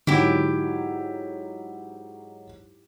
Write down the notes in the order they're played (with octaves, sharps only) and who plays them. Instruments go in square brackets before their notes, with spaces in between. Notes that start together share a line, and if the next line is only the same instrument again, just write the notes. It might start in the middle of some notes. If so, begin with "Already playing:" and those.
[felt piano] G#2 F#3 D#4 [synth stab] D3 [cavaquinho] E4 G4